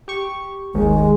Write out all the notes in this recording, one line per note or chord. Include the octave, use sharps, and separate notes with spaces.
G4 C#6
G#1 D#2 G#3